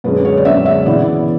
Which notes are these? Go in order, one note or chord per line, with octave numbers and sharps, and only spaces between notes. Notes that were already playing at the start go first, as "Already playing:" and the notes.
F#2 D3 G#3 C#4 B4
C#5
D5
F#2 D3 G#3 C#4 E5
E5
C#3 E3 B3 E4 D5